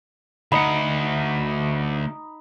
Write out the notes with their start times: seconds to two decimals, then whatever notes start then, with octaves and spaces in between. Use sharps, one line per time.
0.52 D2 D#4 F#5 B5